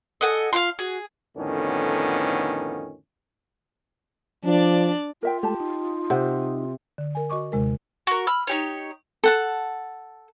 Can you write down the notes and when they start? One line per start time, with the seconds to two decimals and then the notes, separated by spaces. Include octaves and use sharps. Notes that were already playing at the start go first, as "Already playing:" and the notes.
0.21 A4 D#5 F#5 G#5
0.53 F4 F5 F#5 C6
0.79 F#4 G#4
1.37 F2 A2 D3 D#3 B3 C#4
4.45 F3 D4 D5
5.23 F4 A#4 E5 G5
5.43 G#3 A3 G4 A4 A5
5.60 D#4
6.10 C3 C5 F#5
6.98 D3
7.15 A#4 G#5
7.30 F#4 D#5 C#6 D6
7.52 D#2 C3 G#3 A#4
8.07 F#4 A#4
8.27 B5 E6 F6
8.47 D#4 G4 C#5
9.24 A4 F#5 A5